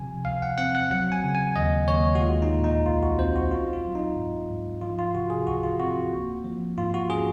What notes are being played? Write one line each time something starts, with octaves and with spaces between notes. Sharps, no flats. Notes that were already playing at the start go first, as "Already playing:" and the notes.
Already playing: C3 F3 G#5
C#2 F5
F#5
C4 F#5
F#5
F#3 F#5
G#5
C#3
G#5
D#2 D#5
D#2 C#5
F#4
G#3 F4
D#4
A#2
D#4
C2 F4
F#4
C4 C5
F#4
C#4 F4
F4
F#3
D#4
G#2
G#2
F3 F4
F4
C3 F#4
G#4
C#2 F#4
F4
C4 F#4
A#3
F3
G#2 F4
F#4
C#4 G#4